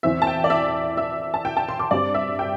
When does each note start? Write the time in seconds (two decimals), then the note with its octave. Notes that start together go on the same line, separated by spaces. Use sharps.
0.03 E2 E3 C4 E5
0.22 A5
0.27 G5
0.44 D5
0.50 E5
0.97 E5
1.34 A5
1.45 G5
1.57 A5
1.69 C6
1.79 D6
1.91 G2 G3 C4 D5
2.14 E5
2.39 G5